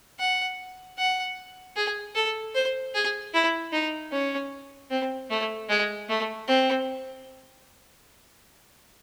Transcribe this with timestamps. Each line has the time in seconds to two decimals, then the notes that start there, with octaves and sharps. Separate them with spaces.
0.19 F#5
0.98 F#5
1.76 G#4
2.15 A4
2.55 C5
2.94 G#4
3.34 E4
3.72 D#4
4.12 C#4
4.90 C4
5.30 A3
5.69 G#3
6.09 A3
6.48 C4